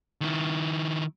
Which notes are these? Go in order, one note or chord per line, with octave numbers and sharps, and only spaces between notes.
D#3 E4